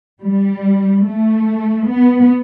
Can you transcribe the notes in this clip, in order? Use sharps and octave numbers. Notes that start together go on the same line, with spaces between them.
G3
A3
B3